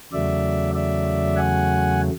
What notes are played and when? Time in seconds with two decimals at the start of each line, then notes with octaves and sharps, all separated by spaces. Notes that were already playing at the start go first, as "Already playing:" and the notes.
0.13 E2 C#3 F#3 A3 D5 E5
0.75 D5 E5
1.36 F#5 G#5